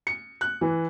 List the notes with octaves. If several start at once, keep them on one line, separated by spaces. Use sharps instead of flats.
C#7
F#6
E3